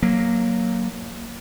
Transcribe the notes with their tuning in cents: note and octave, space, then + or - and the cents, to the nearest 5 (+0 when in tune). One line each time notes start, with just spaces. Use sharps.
F#3 +0 A#3 +0